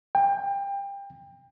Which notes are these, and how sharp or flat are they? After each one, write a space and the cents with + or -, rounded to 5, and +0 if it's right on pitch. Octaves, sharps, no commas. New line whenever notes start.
G5 +25